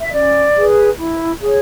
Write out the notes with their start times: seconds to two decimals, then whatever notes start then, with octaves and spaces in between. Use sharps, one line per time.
0.01 E5
0.12 C#4 D5
0.55 G#4 B4
0.98 E4
1.41 G#4 C#5